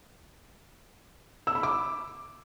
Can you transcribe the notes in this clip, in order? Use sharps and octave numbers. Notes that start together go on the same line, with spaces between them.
E6
B5
D6